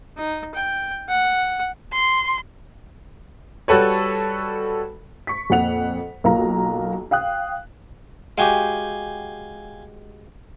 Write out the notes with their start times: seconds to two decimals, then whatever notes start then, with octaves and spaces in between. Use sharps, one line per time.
0.17 D#4
0.55 G5
1.09 F#5
1.93 C6
3.68 G3 F#4 A4 B4 C#5
5.27 C#6 B6
5.50 F2 A#2 F#5 F7
6.24 B1 A#3 F4 A#5
7.11 F5 G5 D#6 F#6
8.38 G#3 F#4 G4 F5 G5 G#5